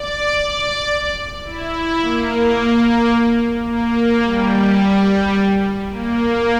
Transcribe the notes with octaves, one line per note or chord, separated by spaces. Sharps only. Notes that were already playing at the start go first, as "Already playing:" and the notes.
Already playing: D5
D5
E4
A#3
A#3
G3
A#3